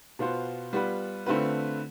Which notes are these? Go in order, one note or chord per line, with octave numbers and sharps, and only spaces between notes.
B2 B3 F4 C5
G3 B3 F4 B4
D3 A3 C4 F4 B4